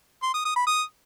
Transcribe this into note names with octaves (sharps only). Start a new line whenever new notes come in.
C6
D#6
D#6
B5
D#6